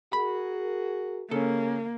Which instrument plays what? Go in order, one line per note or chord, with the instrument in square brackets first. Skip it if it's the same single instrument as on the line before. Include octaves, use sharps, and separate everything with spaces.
[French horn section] F#4 G#4 A#4 [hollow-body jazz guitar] B5
[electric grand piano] C#3 C#4 [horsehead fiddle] A#3 [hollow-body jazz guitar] A4